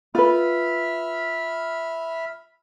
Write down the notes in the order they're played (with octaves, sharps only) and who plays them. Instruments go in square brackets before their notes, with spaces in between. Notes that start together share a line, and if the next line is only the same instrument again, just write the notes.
[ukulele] F4 B4 [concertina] E5 B5 F6